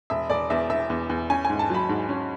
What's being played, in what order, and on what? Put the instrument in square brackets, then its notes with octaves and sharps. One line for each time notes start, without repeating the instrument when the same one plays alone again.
[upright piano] E1 E5
E1 D5
E2 E5
E1 E5
E2
E2
C#4 G#5
G#5
G#2
A5
F#3 B5
G#2
C#4